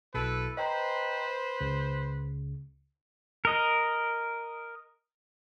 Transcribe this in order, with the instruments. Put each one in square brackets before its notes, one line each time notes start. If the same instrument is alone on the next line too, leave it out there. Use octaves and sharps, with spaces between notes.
[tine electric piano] B1 B2 [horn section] E4 A4 B4
[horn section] B4 C5 [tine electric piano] D#5 G5 A#5
[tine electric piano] C#2 C#3
[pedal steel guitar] A#4 D#5